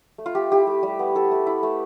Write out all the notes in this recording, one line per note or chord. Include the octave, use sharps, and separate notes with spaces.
A3
F4
A3 G4
E4 G4
A3
G3
B3
E4 A4
A3
E4
A3